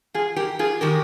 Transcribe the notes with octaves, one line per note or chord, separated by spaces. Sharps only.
F4 G#4
G4 A#4
F4 G#4
D#3 G#3 G4 A#4